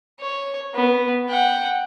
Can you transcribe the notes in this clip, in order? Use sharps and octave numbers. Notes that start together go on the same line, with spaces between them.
C#5
B3
F#5 G5